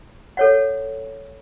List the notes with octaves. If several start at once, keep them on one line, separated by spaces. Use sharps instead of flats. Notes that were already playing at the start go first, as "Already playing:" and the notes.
A4 C#5 F#5